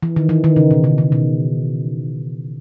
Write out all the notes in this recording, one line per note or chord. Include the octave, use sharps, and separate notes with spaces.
E3
D#3
E3
D#3
C#3
B2
C#3
C#3
B2